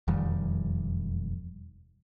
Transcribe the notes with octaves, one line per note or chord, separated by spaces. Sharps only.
E1 F2 D#3 G3